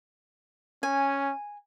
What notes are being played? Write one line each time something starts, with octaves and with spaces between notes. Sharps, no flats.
C#4 G#5